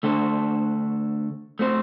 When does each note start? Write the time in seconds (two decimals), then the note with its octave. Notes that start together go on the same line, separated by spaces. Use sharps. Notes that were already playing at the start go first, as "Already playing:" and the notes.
0.03 D3 A3 D4 A4 C5
1.59 A3 C4 F#4 C5